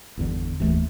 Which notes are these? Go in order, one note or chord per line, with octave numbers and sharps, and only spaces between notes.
G1 E2 D3
F#1 D#2 E3 A3